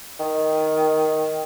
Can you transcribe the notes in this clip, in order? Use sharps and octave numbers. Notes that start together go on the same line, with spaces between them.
D#3